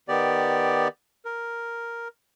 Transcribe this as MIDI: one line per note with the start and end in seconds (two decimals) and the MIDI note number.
0.09 0.88 51
0.09 0.88 59
0.09 0.88 67
0.09 0.88 74
1.25 2.08 70